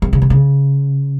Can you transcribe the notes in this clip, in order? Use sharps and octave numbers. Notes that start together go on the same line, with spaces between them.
D#3
C#3
C3
C#3